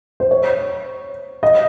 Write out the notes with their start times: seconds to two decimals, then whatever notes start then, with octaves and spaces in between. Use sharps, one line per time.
0.20 C5
0.31 C#5
1.43 D#5